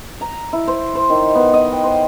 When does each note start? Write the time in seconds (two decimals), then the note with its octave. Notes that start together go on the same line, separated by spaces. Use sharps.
0.21 A#5
0.53 E4
0.68 C5
0.95 C5
1.10 D#3
1.35 B3
1.54 D#5
1.72 G5
1.84 C5